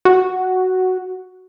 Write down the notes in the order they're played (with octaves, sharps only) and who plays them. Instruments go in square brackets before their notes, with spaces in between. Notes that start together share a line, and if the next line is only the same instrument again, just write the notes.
[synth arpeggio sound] F#4